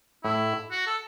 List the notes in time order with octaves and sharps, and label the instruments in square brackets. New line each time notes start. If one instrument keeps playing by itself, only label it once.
[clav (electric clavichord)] A2 [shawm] E4
[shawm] F#4
A4